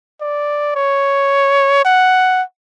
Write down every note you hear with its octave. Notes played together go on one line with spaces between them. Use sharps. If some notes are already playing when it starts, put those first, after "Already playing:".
D5
C#5
F#5